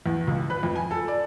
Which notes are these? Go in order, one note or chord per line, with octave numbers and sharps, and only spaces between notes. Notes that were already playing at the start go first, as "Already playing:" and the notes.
E2
C#2
B4
F2
G#5
A4
D5